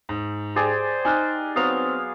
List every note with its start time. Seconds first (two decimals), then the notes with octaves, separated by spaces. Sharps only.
0.09 G#2
0.56 G4 G#4 C5 D5
1.05 D#4 G#5 F6 F#6
1.56 F#3 B3 C4 F5 D#6 F7